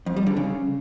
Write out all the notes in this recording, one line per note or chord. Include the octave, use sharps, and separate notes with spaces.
F2
G3
D3
C#3